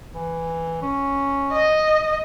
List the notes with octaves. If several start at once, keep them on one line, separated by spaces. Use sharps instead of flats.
E3
C#4
D#5